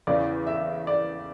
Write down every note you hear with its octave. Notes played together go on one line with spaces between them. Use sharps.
E2 C#3 E3 D5
E5
D5